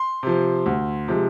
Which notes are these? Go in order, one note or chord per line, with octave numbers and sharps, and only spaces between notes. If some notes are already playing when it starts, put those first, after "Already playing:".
Already playing: C6
C3 F3
D2
C3 F3 G#3